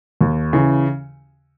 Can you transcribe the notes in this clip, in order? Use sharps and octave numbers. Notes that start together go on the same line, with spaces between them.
D#2
C#3 E3